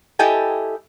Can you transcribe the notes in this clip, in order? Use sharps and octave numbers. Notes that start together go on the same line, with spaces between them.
E4 G4 A4 D#5 G5 G#5